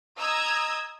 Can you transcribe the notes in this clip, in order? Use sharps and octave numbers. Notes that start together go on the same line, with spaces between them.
D#5 A#5 D#6 E6 G#6